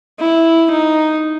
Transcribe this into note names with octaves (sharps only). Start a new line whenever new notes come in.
E4
D#4